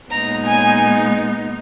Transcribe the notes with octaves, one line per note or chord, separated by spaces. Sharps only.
A#2 G#3 B3 D#4 A#5
G#5